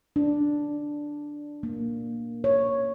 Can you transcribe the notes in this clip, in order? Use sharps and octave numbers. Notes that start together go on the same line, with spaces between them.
D4
A#3
C#5